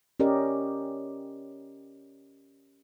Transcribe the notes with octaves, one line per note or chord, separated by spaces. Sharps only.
C#4 G4 A#4 D5 D#5